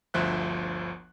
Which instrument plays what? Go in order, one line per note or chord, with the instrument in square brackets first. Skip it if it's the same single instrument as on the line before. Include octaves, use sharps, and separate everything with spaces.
[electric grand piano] G1 D2 F3 C5 E5 F#6